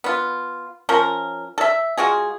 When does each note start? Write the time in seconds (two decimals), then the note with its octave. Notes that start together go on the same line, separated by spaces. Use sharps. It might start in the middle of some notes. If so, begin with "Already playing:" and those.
0.04 B3 F4
0.89 F3 C#4 A#4
1.58 A4 E5
1.98 G#3 F4 F#4 G#4